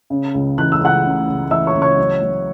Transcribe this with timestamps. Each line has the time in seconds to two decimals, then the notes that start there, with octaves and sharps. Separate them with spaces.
0.10 C#3
0.34 C#2
0.58 E3 F#6
0.72 E6
0.80 C#2 F#5 F#6
1.04 C#3
1.28 C#2
1.51 E3 E5 E6
1.66 C#5 C#6
1.74 C#2
1.82 C#5 C#6
1.97 F#3
2.22 F#3